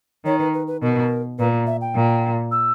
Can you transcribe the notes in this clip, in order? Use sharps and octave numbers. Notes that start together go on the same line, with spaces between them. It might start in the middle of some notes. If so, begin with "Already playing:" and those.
D#3 C#5
B4
B4
B4
B2 A#4
A#2 B4
E5
G5
A#2
E6